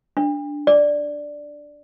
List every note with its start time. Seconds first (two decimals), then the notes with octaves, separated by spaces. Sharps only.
0.17 D4
0.67 D5